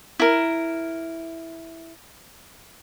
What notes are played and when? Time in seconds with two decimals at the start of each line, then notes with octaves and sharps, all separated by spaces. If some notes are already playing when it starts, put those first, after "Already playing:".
0.19 E4 A#4